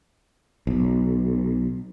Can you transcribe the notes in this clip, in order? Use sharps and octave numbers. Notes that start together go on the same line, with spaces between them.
B1